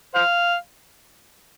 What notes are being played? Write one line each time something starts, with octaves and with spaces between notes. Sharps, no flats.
C5 F5